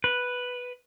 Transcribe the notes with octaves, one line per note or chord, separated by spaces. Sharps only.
B4